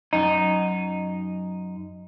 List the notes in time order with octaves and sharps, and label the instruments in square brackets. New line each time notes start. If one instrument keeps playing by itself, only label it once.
[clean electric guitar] F#2 D#4